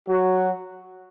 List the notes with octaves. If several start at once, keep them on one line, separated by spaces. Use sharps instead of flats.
F#3 F#4